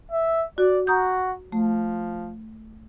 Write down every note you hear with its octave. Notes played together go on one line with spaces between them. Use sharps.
E5
F#4 D5
F#4 A#5 D#6 G6
F3 A3